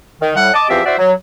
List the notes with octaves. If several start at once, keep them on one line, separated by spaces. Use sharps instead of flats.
D#3
A2 G3 F#5
D#5 A5 D6
E2 F3 C4 G4 C5 E5
E4 F#4 C5 D5 E5
F#3